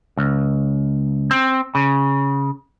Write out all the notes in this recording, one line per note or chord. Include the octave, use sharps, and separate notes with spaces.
C#2
C4
C#3